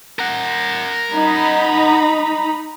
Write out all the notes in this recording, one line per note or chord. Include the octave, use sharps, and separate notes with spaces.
A#4 F#5
D#4 A#5 B5